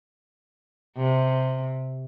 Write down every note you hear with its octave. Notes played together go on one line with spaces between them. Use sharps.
C3